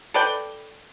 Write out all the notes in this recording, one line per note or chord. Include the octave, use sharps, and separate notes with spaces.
A4 B4 D5 G5